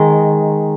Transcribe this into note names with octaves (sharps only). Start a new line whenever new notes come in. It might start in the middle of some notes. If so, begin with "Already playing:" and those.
Already playing: D#3 G#3